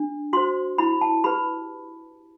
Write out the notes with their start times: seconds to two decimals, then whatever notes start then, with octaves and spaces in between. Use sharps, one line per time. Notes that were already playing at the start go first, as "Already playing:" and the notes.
Already playing: D4
0.33 F#4 C5 C6
0.78 E4 B5
1.01 A5
1.24 G4 B4 B5